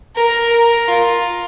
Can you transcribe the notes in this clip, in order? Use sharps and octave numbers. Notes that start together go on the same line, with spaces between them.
A#4
A#4
F4